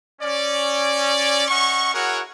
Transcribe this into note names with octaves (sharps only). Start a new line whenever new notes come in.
C#4 D5
C#4 D#5 F#5 C#6
E4 F#4 G#4 A#4 C#5 F#5